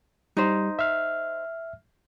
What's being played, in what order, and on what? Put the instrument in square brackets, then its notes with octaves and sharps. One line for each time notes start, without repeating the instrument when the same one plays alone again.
[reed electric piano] G3 [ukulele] D#4 C5
[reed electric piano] E5 F6